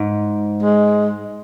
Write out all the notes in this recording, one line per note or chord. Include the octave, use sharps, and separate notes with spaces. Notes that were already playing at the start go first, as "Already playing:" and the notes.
Already playing: G#2
G#3